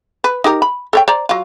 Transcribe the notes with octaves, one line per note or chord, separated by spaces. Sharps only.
B4
D#4 G4 A#4
B5
A4 C#5 G5
C5 D5 A#5
F#3 F4